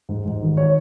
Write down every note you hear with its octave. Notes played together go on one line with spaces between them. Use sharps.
G#2
G#2
D#3
C#5